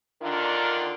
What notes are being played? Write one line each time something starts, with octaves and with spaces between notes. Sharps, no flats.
D3 D#3 D4 F4 A#4